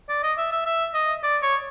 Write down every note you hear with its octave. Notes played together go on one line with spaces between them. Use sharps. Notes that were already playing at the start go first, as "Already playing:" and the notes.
D5
D#5
E5
E5
E5
D#5
D5
C#5